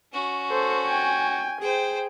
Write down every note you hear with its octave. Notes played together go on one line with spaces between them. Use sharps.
C#4 F#4
A4 C5
G5 G#5
G#4 C5 G5